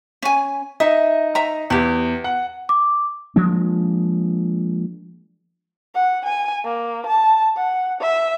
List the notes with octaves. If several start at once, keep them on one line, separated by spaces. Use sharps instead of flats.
C#4 G#5
D#4 D#5 E5
E5 A#5
E2 E4 G4
F#5
D6
F3 G#3 A#3 D4
F#5
G#5
A#3
A5
F#5
E5